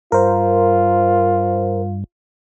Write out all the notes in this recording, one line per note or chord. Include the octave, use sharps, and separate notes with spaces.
G2 F4 A#4 C5